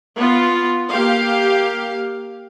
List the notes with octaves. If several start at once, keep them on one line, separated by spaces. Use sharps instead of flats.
B3 F4
A#3 G4 F5